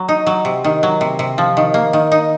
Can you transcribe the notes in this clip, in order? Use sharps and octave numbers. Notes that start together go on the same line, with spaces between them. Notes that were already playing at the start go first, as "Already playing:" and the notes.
Already playing: F#3
D#4
F#3
C3
D#3
F#3
C3
C3
F3
D#3
A#3
D#3
D#4